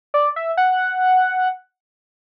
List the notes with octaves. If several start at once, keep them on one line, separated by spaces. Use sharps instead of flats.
D5
E5
F#5